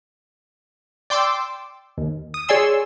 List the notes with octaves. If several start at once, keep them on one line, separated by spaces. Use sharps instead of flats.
D5 G5 C6 D6 E6
D#2
D#6
G#4 C#5 D5 G#5 C6 E6